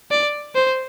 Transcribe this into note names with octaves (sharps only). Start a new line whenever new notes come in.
D5
C5